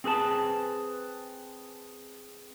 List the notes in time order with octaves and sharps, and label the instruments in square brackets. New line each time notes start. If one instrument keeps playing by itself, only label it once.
[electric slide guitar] C4 G#4 B4 A5